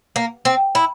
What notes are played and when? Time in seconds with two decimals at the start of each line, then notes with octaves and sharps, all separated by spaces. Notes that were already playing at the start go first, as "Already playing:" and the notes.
0.16 A#3
0.45 C4
0.75 E4